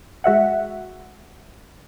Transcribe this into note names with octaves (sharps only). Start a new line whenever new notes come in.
G#3 F#4 E5 F#5